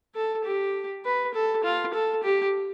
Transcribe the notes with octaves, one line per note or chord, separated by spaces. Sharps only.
A4
G4
B4
A4
F4
A4
G4